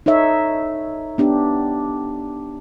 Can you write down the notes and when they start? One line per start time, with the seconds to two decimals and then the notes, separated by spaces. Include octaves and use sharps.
0.06 D#4 A4 C#5 E5
1.18 B3 D4 G4